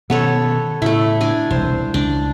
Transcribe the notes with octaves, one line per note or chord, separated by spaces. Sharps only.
B2 D#3 B3 C#4 A4 C#5
A2 C#3 A3 E4
D4 G#5
E1 C2 C5
C#2 D4